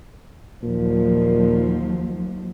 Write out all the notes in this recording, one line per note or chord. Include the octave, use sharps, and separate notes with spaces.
D#2 A#2 F3 F#3